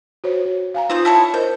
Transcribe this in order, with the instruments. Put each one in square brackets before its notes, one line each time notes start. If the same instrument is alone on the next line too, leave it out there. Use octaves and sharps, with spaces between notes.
[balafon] F#4 C5 C#5
F#4
F5 G#5 A#5
[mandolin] C4 D#6 G6 [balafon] D#4 F4
[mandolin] E4 A4 C#5
[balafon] A#4 C5 D#5 [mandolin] G6